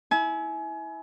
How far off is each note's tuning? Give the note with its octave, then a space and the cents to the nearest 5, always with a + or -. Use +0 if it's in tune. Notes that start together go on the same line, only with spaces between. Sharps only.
E4 -20 G#5 +30